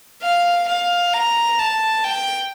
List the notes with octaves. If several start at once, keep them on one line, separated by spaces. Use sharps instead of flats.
F5
F5
A#5
A5
G5